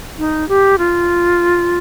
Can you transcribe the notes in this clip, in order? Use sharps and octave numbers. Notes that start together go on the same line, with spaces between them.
D#4
G4
F4